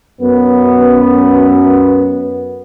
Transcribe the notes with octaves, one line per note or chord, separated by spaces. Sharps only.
F#2 B3